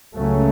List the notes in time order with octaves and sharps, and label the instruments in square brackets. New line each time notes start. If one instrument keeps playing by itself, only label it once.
[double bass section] C#2 C#3 F#3 A3 C#4